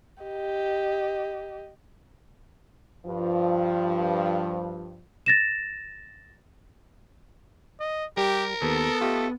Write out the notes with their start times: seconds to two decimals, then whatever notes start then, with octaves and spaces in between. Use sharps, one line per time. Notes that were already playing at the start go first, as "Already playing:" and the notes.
0.23 G4 D#5
3.06 G2 F3
5.26 A6 A#6 E7
7.80 D#5
8.17 G3 G4 A#4 G5
8.62 D#2 B3 A4
9.01 A3 F4 G4 D#5